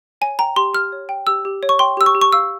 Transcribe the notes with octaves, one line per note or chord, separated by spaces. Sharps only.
C#5 G#5
G5 A#5
G4 C6
G4 F6
C#5
G5
G4 E6
G4
C#5
C#6
G5 C6
G4 E6
C#6
G4
C#6
F5 E6